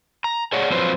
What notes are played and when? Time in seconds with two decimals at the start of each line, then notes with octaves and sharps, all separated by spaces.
0.24 A#5
0.53 G#4 C#5 D5 F#5
0.70 F3 F#3 C4 F4 B4 C5